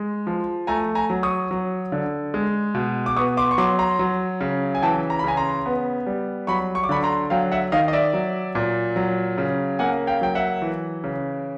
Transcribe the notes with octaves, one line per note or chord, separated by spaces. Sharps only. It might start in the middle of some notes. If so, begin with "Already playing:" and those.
Already playing: G#3
F3
A3 G#5 A#5
G#5 A#5
F#3
C#6 D#6
F#3
D3
G#3
B2
D6
B3 C#6 D#6
C6 D6
C#6
F#3 C6 D6
A#5 C6
F#3
C#3
G#5
E3 G5 A5
A#5
B5
C#3 G#5 A#5
A#5 C6
B3
G3
F#3 B5 C#6
C#6
D6
D3 B5 C#6
A#5 C6
F#3 F5 G5
E5 F#5
D#3 D#5 F5
D#5
D5 E5
F#3
A#2
F#3
C#3
A#3 F#5 G#5
F5 G5
F#3 G5
E5 F#5
E3
C#3